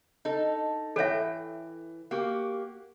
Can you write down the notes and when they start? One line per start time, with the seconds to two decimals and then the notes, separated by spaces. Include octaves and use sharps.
0.25 D#4 A4
0.96 E3 A4 C#5 E5 G5
2.11 A#3 F#4 G4